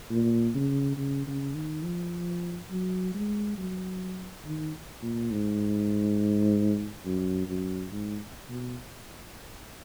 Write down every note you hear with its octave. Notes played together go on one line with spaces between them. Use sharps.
A#2
C#3
C#3
C#3
D#3
F3
F#3
G#3
F#3
D#3
A#2
G#2
F#2
F#2
G#2
B2